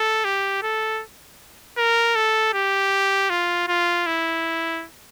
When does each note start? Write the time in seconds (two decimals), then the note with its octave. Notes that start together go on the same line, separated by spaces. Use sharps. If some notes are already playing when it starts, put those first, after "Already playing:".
Already playing: A4
0.25 G4
0.62 A4
1.77 A#4
2.15 A4
2.54 G4
3.30 F4
3.68 F4
4.06 E4